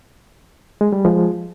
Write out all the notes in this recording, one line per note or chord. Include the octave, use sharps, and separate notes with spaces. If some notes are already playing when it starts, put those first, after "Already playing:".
G#3
G3
F3 G#3